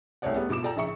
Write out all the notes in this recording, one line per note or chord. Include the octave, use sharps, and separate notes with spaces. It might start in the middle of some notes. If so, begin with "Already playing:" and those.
C2 A3 C#4 C#5 D5 F#5
G3 A3 B3
G2 B2 F4 D6 E7
F4 A4 D5 G5 A#5
A#1 C#3 E4 E5 C#6 C#7